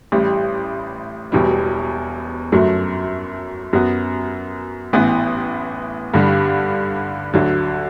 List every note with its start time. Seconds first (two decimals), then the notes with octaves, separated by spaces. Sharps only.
0.12 A1 A2 G3
1.32 E1 E2 B2 G3
2.52 G1 F#2 F#3 A3
3.73 F#2 F#3 B3
4.93 A1 A2 E3 B3
6.14 G2 D3 G3
7.34 D2 D3 F#3